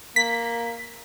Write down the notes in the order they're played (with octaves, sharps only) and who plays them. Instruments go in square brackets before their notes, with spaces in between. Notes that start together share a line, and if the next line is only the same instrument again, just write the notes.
[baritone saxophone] A#3 [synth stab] B6